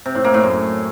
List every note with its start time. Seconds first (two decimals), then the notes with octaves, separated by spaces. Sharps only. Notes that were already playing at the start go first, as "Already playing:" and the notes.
0.06 C3
0.15 A2
0.25 A#3
0.34 A2
0.43 F#2